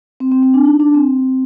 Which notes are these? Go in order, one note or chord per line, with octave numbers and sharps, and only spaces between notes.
C4
C4
C4
D4
D#4
D4
C4